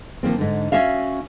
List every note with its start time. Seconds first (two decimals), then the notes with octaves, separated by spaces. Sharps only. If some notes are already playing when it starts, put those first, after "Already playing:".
0.23 D#3 F3 A#3 C4
0.38 G#2 D3
0.72 C#4 F#4 E5 F5